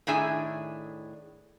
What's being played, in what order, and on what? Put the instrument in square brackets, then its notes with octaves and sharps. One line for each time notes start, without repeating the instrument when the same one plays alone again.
[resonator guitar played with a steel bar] A2 D#3 D4 G#4 E5 G#5